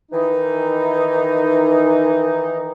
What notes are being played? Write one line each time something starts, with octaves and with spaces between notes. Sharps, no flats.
D#3 E3 D#4